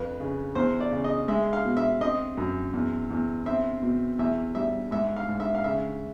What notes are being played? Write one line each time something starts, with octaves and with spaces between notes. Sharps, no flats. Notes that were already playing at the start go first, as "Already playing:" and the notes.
Already playing: F2 B4
C#3
E2 C5
D5
C#3
D#5
G#3 E5
F5
B2
E5
C4 D#5
F#2
E2
E2
C4 E5
B2
E2 E5
G3 E5
G#2 E5
F5
G#2
E5
F5
C#3 E5